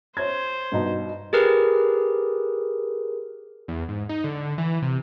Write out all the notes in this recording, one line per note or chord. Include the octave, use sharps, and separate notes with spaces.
C5 C#5 G#6
G2 B2 D#4
G4 G#4 A#4 B4
E2
G#2
D#4
D3
E3
C3